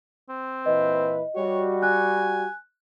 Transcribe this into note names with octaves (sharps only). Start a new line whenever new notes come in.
C4
A#2 E3 B4 D#5
G3 F#4 C#5
G#5 F#6